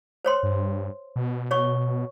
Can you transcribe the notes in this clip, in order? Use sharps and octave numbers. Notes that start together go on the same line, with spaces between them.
C5 C#5 C6
G2
B2
C#5 C#6